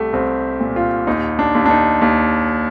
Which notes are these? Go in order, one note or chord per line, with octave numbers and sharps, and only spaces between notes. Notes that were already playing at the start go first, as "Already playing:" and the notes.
Already playing: C2 A3 G4
C2 C4
A#2
F4
D#2 D#4
D4
D#2
D4
D#4
D#2